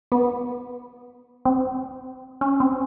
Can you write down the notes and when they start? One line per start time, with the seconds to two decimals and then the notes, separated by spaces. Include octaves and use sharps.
0.12 B3
1.45 C4
2.41 C#4
2.60 C4